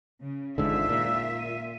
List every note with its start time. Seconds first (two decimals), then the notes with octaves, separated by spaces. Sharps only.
0.21 C#3
0.58 G#1 G#2 D3 F4 E5 E6
0.89 A#2
1.39 D#7